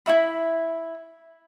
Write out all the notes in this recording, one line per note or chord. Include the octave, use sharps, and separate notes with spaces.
E4 F#4 E5 B5